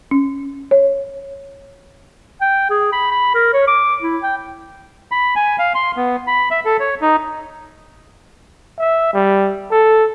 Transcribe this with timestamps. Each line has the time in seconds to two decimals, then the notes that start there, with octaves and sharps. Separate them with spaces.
0.11 C#4
0.71 C#5
2.41 G5
2.70 G#4
2.92 B5
3.11 B5
3.34 A#4
3.53 C#5
3.67 D6
4.02 E4
4.23 G5
5.12 B5
5.36 G#5
5.59 F5
5.75 C6
5.97 B3
6.27 B5
6.51 E5
6.65 A4
6.80 C#5
7.02 D#4
8.78 E5
9.14 G3
9.71 A4